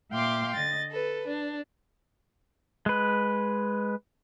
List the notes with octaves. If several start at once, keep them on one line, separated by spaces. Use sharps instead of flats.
A#2 E5 F5 G5 C6 D6
D3 D#5 A6
A4 B4
D4
G#3 B4